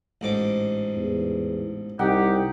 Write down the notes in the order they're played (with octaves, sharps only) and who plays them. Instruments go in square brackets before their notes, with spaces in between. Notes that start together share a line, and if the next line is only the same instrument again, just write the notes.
[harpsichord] A1 G#2 D6
[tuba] E2
[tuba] C2 [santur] D#4 F#5 G5 [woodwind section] G4